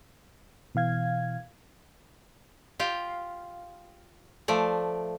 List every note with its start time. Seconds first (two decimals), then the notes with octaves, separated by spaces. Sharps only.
0.75 B2 E3 F5 G#6
2.79 F4 G4 F5 G5
4.48 F3 A3 D5